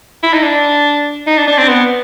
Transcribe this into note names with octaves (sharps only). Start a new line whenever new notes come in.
E4
D#4
D4
D#4
D4
D4
C4
B3